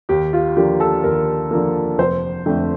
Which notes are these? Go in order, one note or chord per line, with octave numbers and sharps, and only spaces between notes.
D#2 G4
F4
D3 F3 A#3 G4
A4
D#2 A#4
D3 F3 A#3
F1 C5
F2 D3 A3